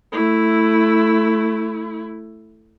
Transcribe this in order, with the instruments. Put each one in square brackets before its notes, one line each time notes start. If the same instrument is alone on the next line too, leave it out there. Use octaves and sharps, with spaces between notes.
[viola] A3 E4